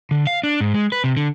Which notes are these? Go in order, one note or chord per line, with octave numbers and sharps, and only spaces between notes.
D3
F5
D4
G#2
G#3
B4
C3
D3